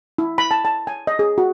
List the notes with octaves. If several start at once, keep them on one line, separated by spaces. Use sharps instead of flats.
E4
B5
A5
A5
G#5
D#5
G#4
F#4